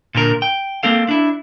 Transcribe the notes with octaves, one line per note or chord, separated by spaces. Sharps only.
A#2 D3 A#4
G5
A#3 C4 A4 F5
D4 E4